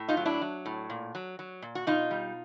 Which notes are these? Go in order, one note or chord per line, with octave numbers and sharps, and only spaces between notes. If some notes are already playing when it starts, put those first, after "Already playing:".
Already playing: A2
D#4 F4
F#3
D4 E4
F#3
A2
A#2
F#3
F#3
A#2
F#4
B2 D#4 F4
G3